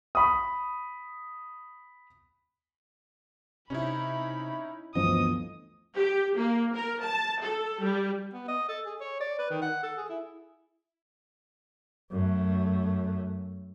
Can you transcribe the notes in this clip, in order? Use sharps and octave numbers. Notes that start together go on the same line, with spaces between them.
B5 D#6
C3 C#4 D#4 E4 B5
G1 D2 E3 F3 B3 C4 D#5 D#6
G4
A#3
A#4
A5
A4
G3
B3
D#5
A4
G#4
C#5
D5
B4
D#3
F#5
A4
G#4
E4
F#2 A3